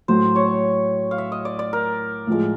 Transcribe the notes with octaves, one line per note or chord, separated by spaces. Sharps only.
A2 F#3 A3 C5
C#5
F5
E5
D#5
D5
D5
A#4
A2 F3 G#3